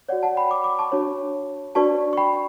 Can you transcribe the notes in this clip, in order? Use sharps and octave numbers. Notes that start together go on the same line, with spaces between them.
F#4 C#5 D5 F#5
F#5 A5
G5 B5
B5 D6
B5 D6
A5 C#6
D4 F#4 C#5
D4 F#4 B4 D5 A5 C#6
C#6
G5 B5